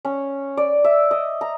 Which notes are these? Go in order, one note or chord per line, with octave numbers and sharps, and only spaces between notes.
C#4
D5
E5
D#5
A#5